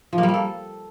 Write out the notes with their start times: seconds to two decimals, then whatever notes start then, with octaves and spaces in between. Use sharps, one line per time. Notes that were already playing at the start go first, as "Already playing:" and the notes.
0.13 F3
0.18 A#3
0.23 G3
0.28 A#3
0.34 A4